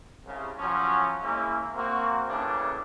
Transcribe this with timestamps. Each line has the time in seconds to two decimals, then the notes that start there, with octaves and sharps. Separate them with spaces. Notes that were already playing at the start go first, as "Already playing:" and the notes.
0.25 C2 C#3
0.59 F3 F#3 C#4
1.22 G#3 A#3 C#4 E4
1.74 A#3 C4 F#4
2.28 A2 C#3 E3 A3 A#3 D4